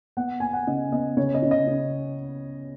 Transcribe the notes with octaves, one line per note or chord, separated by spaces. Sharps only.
B3 F#5
B3 G#5
F#5
C#3 D#5
B3 D#5
C#3 C#5
D#5
C#3
D#5
C#3